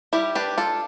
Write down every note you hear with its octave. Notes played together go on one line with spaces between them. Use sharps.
G3 E4 G4
D4 G4 B4
D4 F4 A4